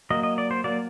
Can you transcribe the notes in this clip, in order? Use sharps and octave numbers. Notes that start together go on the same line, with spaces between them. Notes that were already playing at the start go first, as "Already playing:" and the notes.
F#3 A#3 D#5
D#5
D5
C5
F#3 A#3 D5